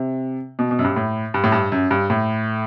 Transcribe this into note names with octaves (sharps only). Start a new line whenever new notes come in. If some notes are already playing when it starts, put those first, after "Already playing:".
Already playing: C3
B2
B2
F#2
G2
A2
G2
A2
G2
F#2
G2
A2